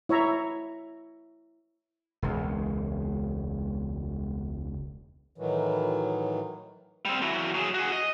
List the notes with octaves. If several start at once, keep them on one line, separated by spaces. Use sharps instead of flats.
E4 C#5 E5 A#5
E1 C#2
A2 D#3 E3 F#3
G3 C4
E3 F#3
F#3 G#4
F#4 G#4
D#5